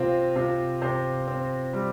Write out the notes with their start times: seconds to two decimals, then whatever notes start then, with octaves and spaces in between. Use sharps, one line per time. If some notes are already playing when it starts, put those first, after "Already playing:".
Already playing: C3 C4 F4
0.36 C3 F4
0.82 C3 C5
1.28 C4
1.73 G3